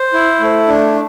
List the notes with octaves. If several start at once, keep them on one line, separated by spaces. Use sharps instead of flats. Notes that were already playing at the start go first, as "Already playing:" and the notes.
Already playing: C5
E4
A3
D4